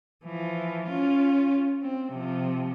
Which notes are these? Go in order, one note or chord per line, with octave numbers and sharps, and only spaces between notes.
E3 F3
C#4 F4
C4
C3 F3